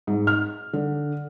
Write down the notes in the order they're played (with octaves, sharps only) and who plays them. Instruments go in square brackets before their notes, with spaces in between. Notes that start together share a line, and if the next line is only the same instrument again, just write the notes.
[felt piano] G#2
F6
D3